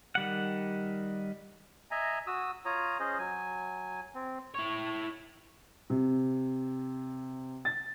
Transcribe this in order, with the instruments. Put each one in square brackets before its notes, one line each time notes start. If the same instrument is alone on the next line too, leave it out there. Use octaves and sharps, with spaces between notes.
[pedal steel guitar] D#3 G3 F#5
[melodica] D#5 E5 G#5 A#5
F#4 D#6 E6
F4 C#5 A#5 D#6
C#4 G#4 C5 D#5
F#3 G#5
C4
[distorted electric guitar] E4 C#5
[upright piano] C3
A6